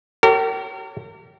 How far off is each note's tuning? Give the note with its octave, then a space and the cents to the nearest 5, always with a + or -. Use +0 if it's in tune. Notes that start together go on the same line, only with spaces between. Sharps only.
G4 -35 A#4 -40 C#5 +0